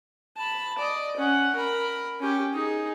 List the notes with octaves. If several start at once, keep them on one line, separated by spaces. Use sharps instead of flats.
A5 B5
D5 D#5
C#4 F#5
A#4 B5
C#4 G4
D#4 G#4